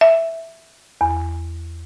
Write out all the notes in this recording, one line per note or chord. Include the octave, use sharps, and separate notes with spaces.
E5
E2